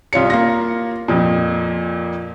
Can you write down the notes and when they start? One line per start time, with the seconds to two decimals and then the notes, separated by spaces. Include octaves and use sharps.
0.13 C2 F4 C#5 C#7
0.30 A#3 F4 A#6
1.08 F2 A#2